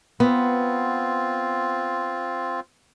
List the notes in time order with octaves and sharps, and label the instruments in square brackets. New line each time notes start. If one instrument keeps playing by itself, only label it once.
[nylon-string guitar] B3 [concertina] C4 F4